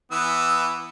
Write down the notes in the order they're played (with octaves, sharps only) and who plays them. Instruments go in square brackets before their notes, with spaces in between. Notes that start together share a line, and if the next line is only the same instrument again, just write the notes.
[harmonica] E3 B3 E6